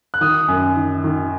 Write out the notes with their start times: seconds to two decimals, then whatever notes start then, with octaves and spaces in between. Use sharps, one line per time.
0.14 F#6
0.21 D#3 D#6
0.48 F#2
0.76 D#3
1.04 D#3